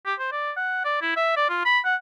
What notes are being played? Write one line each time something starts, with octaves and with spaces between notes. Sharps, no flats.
G4
C5
D5
F#5
D5
E4
E5
D5
F4
B5
F#5